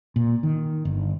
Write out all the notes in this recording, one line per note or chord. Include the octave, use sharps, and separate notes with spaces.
A#2
D#3
G1